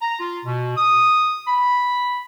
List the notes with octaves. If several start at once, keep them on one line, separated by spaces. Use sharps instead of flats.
A#5
F4
B2
D#6
B5